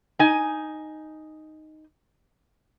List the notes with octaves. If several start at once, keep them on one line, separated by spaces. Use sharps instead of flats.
D#4 G#5